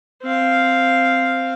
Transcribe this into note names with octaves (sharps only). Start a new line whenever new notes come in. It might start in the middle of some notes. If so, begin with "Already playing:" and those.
C4 F5